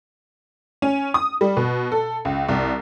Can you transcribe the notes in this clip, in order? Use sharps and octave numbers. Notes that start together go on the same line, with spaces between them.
C#4
D#6
G3
B2
A4
C#2
C2